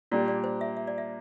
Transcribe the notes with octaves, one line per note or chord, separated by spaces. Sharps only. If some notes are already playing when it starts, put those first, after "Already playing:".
A#2 G3 D4 G4 D5
D5
C5
E5
E5
D5
E5